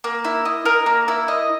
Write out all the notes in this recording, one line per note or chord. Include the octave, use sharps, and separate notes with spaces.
A#3
E4
D#5
A#4
A#3
E4
D#5